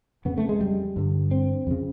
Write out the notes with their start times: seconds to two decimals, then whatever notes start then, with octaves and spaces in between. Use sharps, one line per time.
0.25 F2 C#3 B3
0.38 A3
0.49 G#3
0.61 G3
0.96 G2 D3
1.31 C4
1.67 F2 C#3